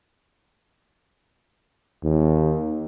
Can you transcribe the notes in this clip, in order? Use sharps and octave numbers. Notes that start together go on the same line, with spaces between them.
D#2